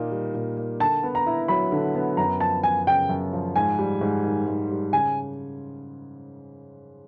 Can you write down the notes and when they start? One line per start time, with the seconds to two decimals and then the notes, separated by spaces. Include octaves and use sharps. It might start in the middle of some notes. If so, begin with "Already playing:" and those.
Already playing: A#2 A#3 D#4
0.11 G3
0.35 A#2
0.57 A#3
0.80 D3 A5
1.03 B3
1.15 A#5
1.27 E4
1.48 F#3 B5
1.72 D3
1.95 B3
2.17 F#2 A#5
2.40 F3 A5
2.63 F#2 G#5
2.87 C#3 G5
3.09 F#2
3.33 F3
3.56 G#2 G#5
3.79 G3
4.01 G#2
4.24 D#3
4.48 G#2
4.70 G3
4.93 C#3 G#5